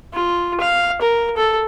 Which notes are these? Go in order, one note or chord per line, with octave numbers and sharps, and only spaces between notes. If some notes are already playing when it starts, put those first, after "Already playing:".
F4
F5
A#4
A4